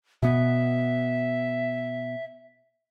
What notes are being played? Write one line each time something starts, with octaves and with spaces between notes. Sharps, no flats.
B2 B3 E5